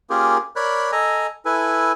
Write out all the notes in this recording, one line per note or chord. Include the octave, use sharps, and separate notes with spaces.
A#3 C#4 F4 G4 G#4 A#4
A#4 C#5 D5 B5 F#6
A4 D#5 G#5 A#5
E4 A4 B4 G#5